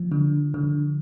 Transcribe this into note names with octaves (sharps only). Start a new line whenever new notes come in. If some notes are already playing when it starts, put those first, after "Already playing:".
Already playing: F3
D3
D3